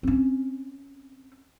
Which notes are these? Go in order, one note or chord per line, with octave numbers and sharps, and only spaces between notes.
C4 C#4